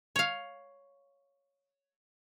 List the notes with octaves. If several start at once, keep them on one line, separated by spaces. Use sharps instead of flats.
C#5 F5